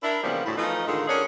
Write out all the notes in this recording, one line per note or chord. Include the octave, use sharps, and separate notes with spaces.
D4 E4 A#4
C#3 E3 F3 G3 A#3 B3
D2 A2 E4
E3 F3 A3 D#4
A2 D3 D#3 G#3 D#4 F4
D3 C#4 D4 G#4 A#4 C#5